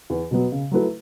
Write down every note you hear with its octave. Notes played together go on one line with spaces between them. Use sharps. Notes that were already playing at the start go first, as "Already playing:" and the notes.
E2
B2 F#3 B3
C#3
F#3 A3 E4 B4